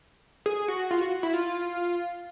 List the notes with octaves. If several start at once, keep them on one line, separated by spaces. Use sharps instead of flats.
G#4
F#4
F4
F#4
E4
F4